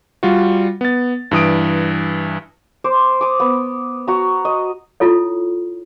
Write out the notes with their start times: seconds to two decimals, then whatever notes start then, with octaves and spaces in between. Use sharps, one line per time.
0.23 G3 F4 F#4
0.81 B3 A6
1.31 G2 E3 D#6 D7
2.84 C5 D6
3.21 D6 D#6
3.40 B3
4.08 F#4 A#5
4.45 D#5
5.00 E4 F4 A4 C#5